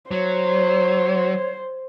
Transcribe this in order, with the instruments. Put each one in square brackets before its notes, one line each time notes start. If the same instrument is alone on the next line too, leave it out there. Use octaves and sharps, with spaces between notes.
[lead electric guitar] F#3 [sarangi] C5 [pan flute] C#5